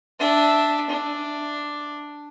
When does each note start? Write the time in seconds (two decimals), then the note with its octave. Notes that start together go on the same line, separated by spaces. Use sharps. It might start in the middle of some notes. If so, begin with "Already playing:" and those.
0.20 D4 E5
0.90 D4